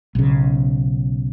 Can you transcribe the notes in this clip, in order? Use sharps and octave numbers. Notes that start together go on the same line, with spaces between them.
B1 C#3